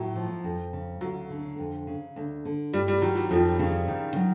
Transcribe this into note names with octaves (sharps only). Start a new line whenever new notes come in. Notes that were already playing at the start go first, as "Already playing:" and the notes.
Already playing: A2 F#3
F3
F2
C#3
D2 F#3
D3
F2
C#3
D2
D3
G2 G3
G3
D#3 F#3
F#3
F2 F3
C#3
D#3
F#3